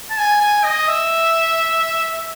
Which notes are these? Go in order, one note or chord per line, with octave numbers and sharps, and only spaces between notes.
A5
G#5
G#5
D#5
E5